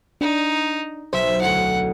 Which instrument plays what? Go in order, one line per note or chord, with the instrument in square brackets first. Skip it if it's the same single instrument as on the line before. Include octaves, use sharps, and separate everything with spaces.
[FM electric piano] D4 [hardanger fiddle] D#4
[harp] B1 [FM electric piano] C5 [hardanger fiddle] E5
[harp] D2 E4 [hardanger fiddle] F#5